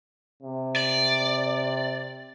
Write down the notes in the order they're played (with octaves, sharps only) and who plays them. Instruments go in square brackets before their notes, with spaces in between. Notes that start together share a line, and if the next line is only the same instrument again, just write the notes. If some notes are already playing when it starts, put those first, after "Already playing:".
[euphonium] C3
[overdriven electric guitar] D5